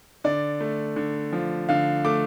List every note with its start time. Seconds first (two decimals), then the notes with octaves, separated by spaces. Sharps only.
0.24 D3 D5
0.60 A3
0.96 D3
1.32 F3
1.69 D3 F5
2.05 A3 D6